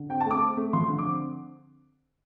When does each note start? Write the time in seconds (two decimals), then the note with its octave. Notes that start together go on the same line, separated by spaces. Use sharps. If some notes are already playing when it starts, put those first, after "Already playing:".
Already playing: D3
0.09 C4 G5
0.20 A5
0.26 A3 D6
0.41 C4
0.57 A3
0.73 F3 C6
0.89 D3
0.98 D6
1.06 C4